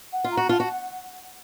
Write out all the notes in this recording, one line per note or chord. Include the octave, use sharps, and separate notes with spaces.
F#5
F4
A#5
F#4
F4 A5
F#4